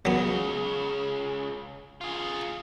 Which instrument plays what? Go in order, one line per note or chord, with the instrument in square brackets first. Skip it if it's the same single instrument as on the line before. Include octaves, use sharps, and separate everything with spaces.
[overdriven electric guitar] C#2 C#3 [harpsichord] F#3 B3
[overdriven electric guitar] F4 G#4